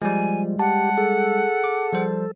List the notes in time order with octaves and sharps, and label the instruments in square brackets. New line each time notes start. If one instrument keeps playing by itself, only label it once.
[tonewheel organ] F3 [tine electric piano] G3 G#3 [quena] G#5
[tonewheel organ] G4 [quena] F#5 [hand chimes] A5
[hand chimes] G#4 [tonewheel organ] A4
[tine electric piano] D6
F3 G3 C5